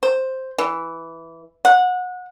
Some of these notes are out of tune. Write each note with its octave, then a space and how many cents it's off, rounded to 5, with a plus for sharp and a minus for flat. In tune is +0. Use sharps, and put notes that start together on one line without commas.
C5 +5
E3 +0
F#5 -25